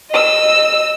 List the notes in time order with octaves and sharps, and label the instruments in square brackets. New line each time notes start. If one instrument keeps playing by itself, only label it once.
[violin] D#5 E6